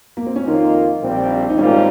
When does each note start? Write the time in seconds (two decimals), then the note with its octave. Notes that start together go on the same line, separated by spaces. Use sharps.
0.17 A#3
0.26 C4
0.36 C#4
0.46 F2 D#3 A#3 D#4 F4
1.02 A#1 A#2 G3 C4
1.49 D#4
1.58 G#1 G#2 G3 A#3 C#4 F4